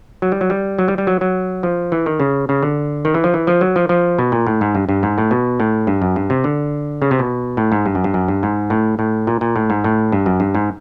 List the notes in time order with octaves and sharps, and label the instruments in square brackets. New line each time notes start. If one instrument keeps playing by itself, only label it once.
[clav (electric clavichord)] F#3
G3
F#3
G3
F#3
G3
G3
F#3
F#3
F3
E3
D#3
C#3
C#3
D3
D#3
E3
F3
E3
F3
F#3
F3
F3
B2
A#2
A2
G#2
G2
G2
G#2
A2
B2
A2
G2
F#2
G2
C3
D3
C#3
C3
B2
A2
G#2
G2
F#2
G2
F#2
G2
G#2
A2
A2
A#2
A#2
A2
G#2
A2
G2
F#2
G2
G#2